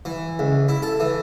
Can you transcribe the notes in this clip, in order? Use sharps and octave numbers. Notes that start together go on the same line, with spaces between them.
E3
C#2
E4
A4
E3